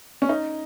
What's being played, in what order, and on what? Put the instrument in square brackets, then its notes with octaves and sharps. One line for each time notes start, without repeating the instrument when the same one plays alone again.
[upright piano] C#4
D#4